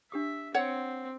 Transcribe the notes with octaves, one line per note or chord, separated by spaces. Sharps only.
D4 G4 E5 D#6
C4 C#5 F#5